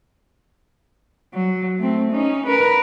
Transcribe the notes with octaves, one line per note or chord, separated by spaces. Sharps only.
F#3
A3 C4
C#4 D#4
A#4 B4